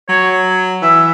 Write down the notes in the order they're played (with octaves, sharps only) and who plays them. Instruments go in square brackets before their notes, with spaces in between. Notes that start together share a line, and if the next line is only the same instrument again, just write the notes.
[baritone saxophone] F#3 [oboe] C#5
[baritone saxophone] E3 [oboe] E5